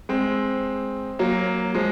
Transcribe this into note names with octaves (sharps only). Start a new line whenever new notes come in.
G#3 C4
F#3 A#3
F3 G#3